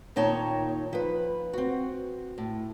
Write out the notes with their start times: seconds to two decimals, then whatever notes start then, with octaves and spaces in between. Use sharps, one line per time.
0.16 D#2 A#2 D#4 C#5 G5 A5
0.93 F3 B4
1.53 C4 F#4
2.38 A2